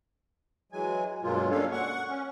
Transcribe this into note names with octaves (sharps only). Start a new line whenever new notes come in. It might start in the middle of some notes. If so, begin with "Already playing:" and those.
E3 F#3 G#3 G#5
G2 B2 F#3 G#3 A#3 F4
A#3 C#4 D4 A4 C#5 F5
F#5 C#6
C#4